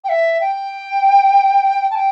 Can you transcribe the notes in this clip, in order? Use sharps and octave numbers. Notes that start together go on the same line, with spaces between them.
G5
E5
G5
A5
G5